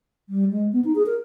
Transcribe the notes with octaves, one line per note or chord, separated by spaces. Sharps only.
G3
G#3
B3
D#4
G#4
A#4